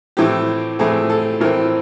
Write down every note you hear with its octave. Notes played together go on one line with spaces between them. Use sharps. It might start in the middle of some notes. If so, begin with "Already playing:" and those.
A2 E3 A3 C4 G4
A2 E3 A3 C4 G#4
A4
A2 E3 A3 C4 A#4